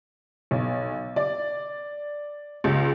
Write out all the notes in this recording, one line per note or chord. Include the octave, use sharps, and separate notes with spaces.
B1
D5
C#2